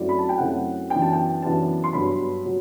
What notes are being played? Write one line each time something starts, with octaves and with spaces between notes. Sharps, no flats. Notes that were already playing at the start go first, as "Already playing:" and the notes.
Already playing: F#2 F#3 A3 C4 E4 D5
B5
A5
G5
F#2 F#3 A3 C4 E4 F#5
F#2 E3 B3 D4 G5
A5
G5
F#2 E3 B3 D4 A5
C6
G2 F#3 B3 D4 B5
F#3